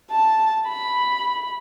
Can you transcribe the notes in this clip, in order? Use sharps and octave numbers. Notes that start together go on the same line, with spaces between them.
A5
B5